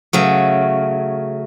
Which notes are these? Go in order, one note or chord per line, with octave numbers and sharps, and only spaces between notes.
C#3 F#3 A3